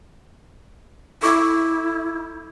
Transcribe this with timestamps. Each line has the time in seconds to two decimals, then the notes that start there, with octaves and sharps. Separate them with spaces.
1.23 E4 A4 C#6 D6